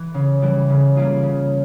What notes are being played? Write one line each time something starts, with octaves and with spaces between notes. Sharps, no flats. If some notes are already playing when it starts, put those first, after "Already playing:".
Already playing: E3
C#3
E3 G3
C#3
G3 A#3 F4 G#4
C#3